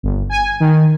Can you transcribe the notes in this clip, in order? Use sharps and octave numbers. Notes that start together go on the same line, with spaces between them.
G1
G#5
D#3